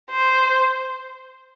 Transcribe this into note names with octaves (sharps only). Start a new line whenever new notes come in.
C5